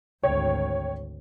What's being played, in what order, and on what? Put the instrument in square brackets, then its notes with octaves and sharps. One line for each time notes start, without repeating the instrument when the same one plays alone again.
[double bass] G#1 D2 [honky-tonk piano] C#5 G5